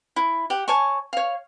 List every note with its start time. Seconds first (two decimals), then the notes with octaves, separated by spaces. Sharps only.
0.16 E4
0.50 G4 F#5
0.68 C#5 G#5 A5 C#6
1.13 C#5 F5